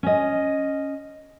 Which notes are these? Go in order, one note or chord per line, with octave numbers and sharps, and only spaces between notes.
C#4 D#5